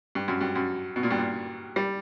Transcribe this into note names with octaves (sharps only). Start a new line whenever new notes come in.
G2
F#2
G2
F#2
B2
A#2
G2
A#2
G3